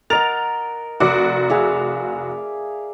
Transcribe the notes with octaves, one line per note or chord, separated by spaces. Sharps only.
A#4 D#5 F#5 A6 F7
F1 F#4 D5
G#4 E5 F5